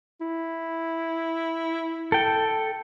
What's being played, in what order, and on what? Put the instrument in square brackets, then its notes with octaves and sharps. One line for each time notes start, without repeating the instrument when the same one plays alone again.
[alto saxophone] E4
[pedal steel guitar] A4 G5